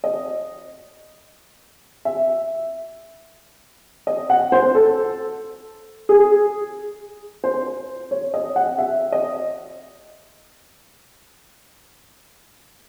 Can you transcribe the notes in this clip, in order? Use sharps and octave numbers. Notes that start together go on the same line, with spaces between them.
D#5
E5
D#5
F#5
C5
A4
G#4
C5
C#5
D#5
F#5
E5
D#5